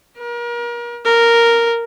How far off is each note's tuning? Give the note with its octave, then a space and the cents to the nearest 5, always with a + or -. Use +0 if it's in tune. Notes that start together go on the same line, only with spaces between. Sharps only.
A#4 +35
A#4 -5